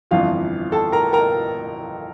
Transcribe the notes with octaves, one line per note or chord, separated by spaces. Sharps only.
G1 F2 E3 F4 F5
A4 A5
A#4 A#5
A#4 A#5